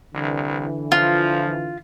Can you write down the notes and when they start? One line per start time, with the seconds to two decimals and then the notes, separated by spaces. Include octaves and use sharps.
0.14 C2 D3 E3
0.92 F3 F4